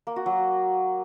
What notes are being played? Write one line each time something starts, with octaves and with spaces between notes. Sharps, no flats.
A#3
F#4
F#3